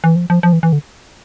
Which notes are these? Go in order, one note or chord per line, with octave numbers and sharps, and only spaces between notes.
E3
F3
F3
F3
E3
E3
D3